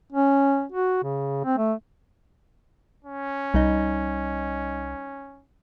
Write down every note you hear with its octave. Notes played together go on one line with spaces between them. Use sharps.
C#4
F#4
C#3
C4
A3
C#4
C2 G3 D#4 D#5